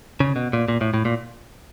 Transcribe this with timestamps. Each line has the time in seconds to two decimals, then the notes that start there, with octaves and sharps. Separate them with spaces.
0.20 C#3
0.36 B2
0.53 A#2
0.68 A#2
0.81 A2
0.94 A2
1.05 A#2